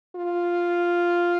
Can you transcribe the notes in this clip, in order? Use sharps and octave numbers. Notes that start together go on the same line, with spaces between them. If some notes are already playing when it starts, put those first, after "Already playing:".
F4